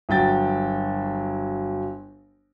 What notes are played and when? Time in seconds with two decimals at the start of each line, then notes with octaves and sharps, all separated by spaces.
0.09 G1 F#3 G5 A6